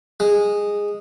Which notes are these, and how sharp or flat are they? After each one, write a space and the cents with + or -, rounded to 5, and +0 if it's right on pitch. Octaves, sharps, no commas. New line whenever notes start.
G#3 -10